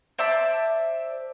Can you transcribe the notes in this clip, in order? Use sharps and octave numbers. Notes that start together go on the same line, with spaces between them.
C5 D5 E5 A5